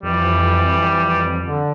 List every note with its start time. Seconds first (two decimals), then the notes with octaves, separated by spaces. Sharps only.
0.03 F2 E3 G3
1.43 D3